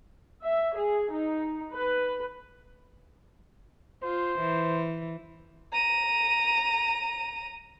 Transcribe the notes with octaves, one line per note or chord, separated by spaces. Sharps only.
E5
G#4
D#4
B4
F4 C5
E3
A#5 D#7